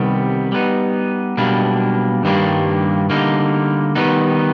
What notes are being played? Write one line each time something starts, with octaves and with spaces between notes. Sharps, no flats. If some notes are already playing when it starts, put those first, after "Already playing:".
Already playing: C2 C3 D#3 G3 B3
G3 B3 D#4
B1 B2 G3 A#3 D4
G2 D#3 G3 A#3 D4
D3 G3 A#3 D#4
D#3 G3 B3 D#4